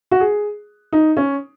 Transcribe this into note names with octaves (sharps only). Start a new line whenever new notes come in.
F#4
G#4
D#4
C#4